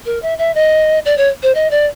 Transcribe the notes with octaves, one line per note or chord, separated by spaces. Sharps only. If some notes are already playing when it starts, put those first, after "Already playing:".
A#4
E5
E5
D#5
D5
C#5
C5
D#5
D5